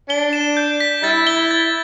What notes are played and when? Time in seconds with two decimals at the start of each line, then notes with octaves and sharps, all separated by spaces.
0.09 D4 G7
0.33 E7
0.57 G6
0.80 B6
1.03 G3 E4 A6
1.27 G7
1.51 A6